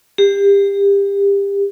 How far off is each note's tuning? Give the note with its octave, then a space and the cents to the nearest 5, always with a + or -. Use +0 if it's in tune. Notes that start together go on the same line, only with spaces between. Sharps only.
G4 +30